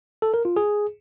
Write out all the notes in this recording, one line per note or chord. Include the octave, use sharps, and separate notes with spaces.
A4
A#4
F4
G#4